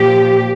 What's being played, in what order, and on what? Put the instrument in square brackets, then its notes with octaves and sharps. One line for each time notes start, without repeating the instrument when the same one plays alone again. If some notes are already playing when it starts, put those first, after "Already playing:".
Already playing: [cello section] A#2 F3 G4